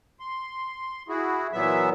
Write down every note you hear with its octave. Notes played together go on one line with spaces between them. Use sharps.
C6
E4 F#4 G#4
A#2 E3 F#3 B3 E5